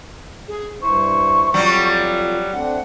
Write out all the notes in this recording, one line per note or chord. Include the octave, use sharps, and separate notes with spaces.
G#4
G2 E4 C5 C#6
F2 F#3 G3 F4
A3 C4 D4 F#5